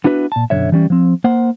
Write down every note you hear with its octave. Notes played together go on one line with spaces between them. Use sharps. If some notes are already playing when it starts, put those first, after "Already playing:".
B3 D4 E4 F#4 B4
A#2 A5
B1 F#2 D3 D#3 C#5 E5
E3 G3 C#4
F3 C4
A#3 C5 F#5